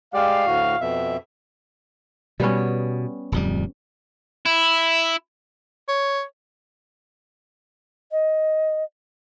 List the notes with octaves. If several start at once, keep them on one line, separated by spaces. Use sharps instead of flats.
G#3 G4 D5 F5
D2 A2 F#4
F2 B2 E5
B2 G3 B3 C#4
D1 F2 G3
E4
C#5
D#5